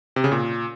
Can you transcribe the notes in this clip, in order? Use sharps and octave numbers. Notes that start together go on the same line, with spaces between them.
C3
C#3
A#2